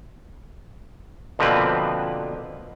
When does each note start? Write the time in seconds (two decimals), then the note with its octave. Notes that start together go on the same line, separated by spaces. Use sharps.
1.39 B2 D3 F3 A#3 C4 B4